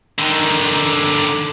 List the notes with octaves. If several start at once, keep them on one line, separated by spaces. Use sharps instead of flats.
D3 D#3